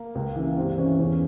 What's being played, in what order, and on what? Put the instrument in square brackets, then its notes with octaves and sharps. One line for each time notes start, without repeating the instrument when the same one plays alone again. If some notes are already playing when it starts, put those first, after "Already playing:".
Already playing: [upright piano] A#3
C#2
C#3 E3
G2 C4
E3 C#4
E2 C#4